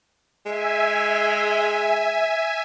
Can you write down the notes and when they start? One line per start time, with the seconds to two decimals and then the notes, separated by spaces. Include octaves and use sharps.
0.46 G#3 E5 G#5